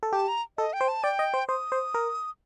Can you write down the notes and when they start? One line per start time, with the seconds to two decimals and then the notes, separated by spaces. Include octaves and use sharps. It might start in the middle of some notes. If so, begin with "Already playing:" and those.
0.03 A4
0.13 G4 A5
0.28 A#5
0.58 A4 D#5
0.73 G5
0.81 C5
0.88 A5
1.03 D5 G5
1.19 D#5
1.34 C5
1.48 C5 D#6
1.72 C5
1.94 A#4